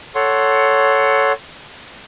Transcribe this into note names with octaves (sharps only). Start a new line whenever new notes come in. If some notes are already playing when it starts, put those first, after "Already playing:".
A4 C#5 F#5 C6